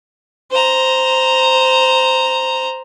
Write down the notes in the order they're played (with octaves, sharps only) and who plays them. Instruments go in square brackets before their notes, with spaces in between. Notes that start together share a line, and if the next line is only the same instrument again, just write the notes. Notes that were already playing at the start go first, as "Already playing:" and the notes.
[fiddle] C5 A#5